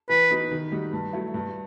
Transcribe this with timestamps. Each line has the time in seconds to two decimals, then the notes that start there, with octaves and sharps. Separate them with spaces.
0.09 E3 B4
0.31 B3 D#4 F#4
0.51 D#3
0.72 G3 D#4 F#4
0.93 G2
1.13 F#3 A3 E4
1.34 G2